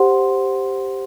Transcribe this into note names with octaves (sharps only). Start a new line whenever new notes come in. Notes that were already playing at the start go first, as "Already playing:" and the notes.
Already playing: G4 C5 F#5 C6